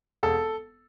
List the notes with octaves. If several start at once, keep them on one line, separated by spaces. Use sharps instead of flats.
E1 A4